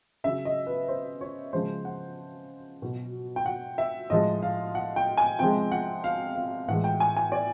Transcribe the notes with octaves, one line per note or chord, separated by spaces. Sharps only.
C#3 F#3 E5
D#5
B4
C5
C#5
C#3 F3 G#3 C5
F#5
B2 F#3
G5
F#5
E5
A2 F3 G#3 D#5
F5
F#5
G5
G#5
C3 F3 G#3 G5
F#5
F5
F5
A2 E3 G#3 F#5
G5
G#5
G#5
D5